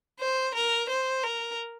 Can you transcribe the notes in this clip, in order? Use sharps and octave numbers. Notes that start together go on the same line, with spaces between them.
C5
A#4
C5
A#4